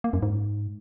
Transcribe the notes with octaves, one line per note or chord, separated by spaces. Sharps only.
A#3
F#2
G#2